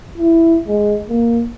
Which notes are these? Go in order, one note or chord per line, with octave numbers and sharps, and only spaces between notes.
E4
G#3
A#3